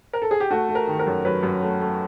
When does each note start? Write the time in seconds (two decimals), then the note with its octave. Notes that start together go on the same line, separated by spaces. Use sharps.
0.13 A#4
0.22 A4
0.31 G#4
0.40 G4
0.50 A3 F#4
0.69 A3
0.75 A#4
0.87 D#3
0.99 A#4
1.07 F#2
1.25 F#3 B4
1.43 F#2
1.62 A3
1.81 A3